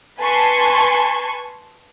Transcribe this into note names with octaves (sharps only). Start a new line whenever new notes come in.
B4 G#5 A5 C6 C#6